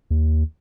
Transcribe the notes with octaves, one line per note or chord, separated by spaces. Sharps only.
D#2